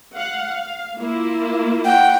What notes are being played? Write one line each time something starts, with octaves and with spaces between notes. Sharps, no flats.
F5 F#5
F5
A#3 E4 F4
F#5 G5